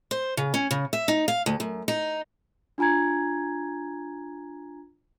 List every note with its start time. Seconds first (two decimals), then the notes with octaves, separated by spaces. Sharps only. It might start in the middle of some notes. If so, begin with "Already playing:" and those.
0.11 C5
0.37 C#3
0.54 C#4
0.71 C#3
0.93 E5
1.08 D#4
1.28 F5
1.46 D2
1.60 F#2
1.88 D#4
2.78 D4 F4 G#5 A#5 G#6